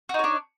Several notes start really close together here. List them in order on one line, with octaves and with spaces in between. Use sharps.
F#4 D#4 C#5 D4